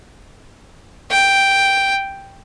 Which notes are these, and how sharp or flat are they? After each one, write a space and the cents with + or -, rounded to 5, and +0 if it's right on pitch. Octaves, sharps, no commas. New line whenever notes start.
G5 +0